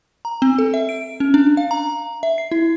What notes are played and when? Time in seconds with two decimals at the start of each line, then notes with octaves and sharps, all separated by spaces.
0.25 A#5
0.42 C4
0.59 A4
0.74 E5
0.89 D7
1.20 C#4
1.34 D4
1.57 F5
1.71 A#5
2.23 E5
2.38 C7
2.51 E4